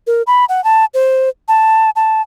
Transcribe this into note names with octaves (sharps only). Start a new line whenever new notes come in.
A#4
B5
F#5
A5
C5
A5
A5